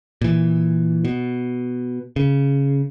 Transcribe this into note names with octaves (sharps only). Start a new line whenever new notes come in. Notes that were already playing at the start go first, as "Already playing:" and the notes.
A#2 E3
B2
C#3